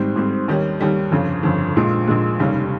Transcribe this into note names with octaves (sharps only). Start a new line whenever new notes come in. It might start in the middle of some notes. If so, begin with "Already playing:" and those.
Already playing: G#1 G#2 G3 C4
G#1 G#2 G3 C4
D#2 D#3 G3 C#4
D#2 D#3 G3 C#4
G1 F2 C#3
G1 F2 C#3
A#1 A#2 G#3
A#1 A#2 G#3
F1 D#2 C#3 G3